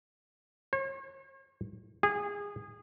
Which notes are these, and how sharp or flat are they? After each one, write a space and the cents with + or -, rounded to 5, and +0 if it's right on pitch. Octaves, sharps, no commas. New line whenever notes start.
C#5 -45
G#4 -25